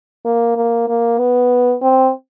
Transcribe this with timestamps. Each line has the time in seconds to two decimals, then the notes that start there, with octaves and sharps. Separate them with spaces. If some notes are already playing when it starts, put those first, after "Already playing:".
0.25 A#3
0.56 A#3
0.88 A#3
1.19 B3
1.82 C4